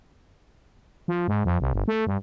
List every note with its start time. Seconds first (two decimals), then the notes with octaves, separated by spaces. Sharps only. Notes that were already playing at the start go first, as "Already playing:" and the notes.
1.08 F3
1.28 G#2
1.45 F2
1.61 C2
1.73 G1
1.88 A3
2.07 G2